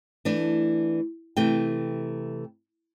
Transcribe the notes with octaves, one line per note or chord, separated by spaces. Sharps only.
E3 A3 D4
C3 E3 A3 G5